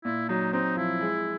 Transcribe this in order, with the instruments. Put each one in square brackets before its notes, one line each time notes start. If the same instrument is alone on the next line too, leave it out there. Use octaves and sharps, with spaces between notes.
[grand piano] A#2 [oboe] E4
[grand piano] F#3 [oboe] D#4
[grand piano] C4 [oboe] D#4
[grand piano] F3 [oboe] E4
[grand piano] G#3